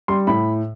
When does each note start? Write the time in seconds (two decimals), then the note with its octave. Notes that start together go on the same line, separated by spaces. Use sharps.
0.08 G3 C6
0.27 A2 B5